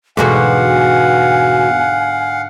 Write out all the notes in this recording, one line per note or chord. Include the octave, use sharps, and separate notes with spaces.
E2 G#2 B2 D3 F#4 F5 F#5 G#5